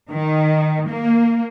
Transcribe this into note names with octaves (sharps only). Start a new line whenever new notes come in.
D#3
A#3